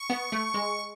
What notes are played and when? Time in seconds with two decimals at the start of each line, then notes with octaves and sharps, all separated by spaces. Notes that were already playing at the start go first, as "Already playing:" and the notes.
Already playing: C#6
0.10 B3
0.32 A3
0.54 G#3